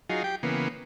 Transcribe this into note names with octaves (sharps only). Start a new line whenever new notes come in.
F#3 D#4 F4 G#4
G4 G5
C#3 E3 A#3 B3